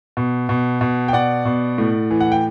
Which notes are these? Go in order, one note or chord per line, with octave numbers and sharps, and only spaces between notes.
B2
B2
B2
G5
B2 D5 F#5
B2
A2
E3
F#5
G5